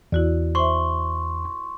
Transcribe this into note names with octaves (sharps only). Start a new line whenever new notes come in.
E2 E4 F#4 D5
C5 E5 C6 C#6